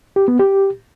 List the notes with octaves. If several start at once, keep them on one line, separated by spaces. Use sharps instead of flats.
G4
B3
G4